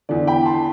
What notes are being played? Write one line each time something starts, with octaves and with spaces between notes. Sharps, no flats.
E2 D3 D5
G5 B5
A5 C6